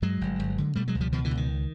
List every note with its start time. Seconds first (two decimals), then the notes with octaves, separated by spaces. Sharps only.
0.02 G2 F#3 G#3
0.21 G1
0.39 G1
0.58 D3
0.75 B2 G3 A3
0.88 F#3 G#3
0.95 C#2
1.01 F3 G3
1.12 B2 D#3 F3
1.25 D3 E3
1.31 C#2
1.37 D#3